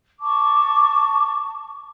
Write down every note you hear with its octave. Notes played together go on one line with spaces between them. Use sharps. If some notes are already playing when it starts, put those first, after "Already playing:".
A5 C#6 D6